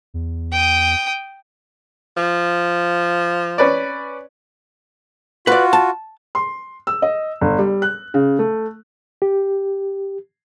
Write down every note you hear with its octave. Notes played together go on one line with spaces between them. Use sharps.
E2
G5 D#6
F3
C#4 B4 D5
F4 F#4 B4 D5
A5
C6
E6
D#5
G1
G3
F#6
C#3
A3
G4